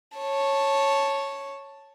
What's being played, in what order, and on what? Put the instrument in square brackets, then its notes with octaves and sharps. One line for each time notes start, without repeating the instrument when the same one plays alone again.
[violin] C#5 A5